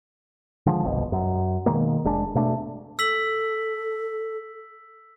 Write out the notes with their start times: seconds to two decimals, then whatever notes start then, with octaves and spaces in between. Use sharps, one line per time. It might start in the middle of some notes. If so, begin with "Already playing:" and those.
0.66 D3 F3 G#3
0.84 G1 C2 B2
1.12 F#2
1.66 B2 D#3 G#3 A#3
2.05 F1 G#3 D4
2.35 B2 A3 D4
2.99 A4 E6 B6 F#7